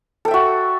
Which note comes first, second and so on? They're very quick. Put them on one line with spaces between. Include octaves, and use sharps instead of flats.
A4 G5 E5 F#4